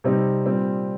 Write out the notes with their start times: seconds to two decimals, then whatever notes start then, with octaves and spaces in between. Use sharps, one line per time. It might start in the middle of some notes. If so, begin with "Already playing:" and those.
0.04 C3 G3 C4 D#4
0.45 A#2 G3 C4